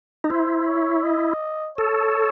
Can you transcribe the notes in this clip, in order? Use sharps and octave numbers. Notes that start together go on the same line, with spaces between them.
D#4
E4 C5
C#5
D#5
A4 C#5